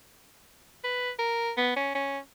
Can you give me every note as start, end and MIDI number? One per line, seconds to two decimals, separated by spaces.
0.84 1.11 71
1.19 1.52 70
1.57 1.73 59
1.76 1.94 61
1.95 2.19 61